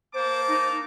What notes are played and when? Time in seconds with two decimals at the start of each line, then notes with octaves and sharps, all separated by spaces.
0.14 A#3 C5 A5 D6
0.48 D#4